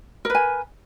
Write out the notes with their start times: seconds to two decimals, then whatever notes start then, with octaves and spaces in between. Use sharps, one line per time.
0.25 A#4
0.30 B4
0.35 G#5